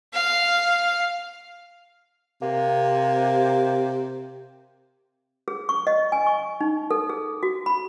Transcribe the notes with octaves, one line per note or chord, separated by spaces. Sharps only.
F5
C3 A#3
G#4
C#6
D#5
G#5
C#6
D#4
A4
G#4
F#4
B5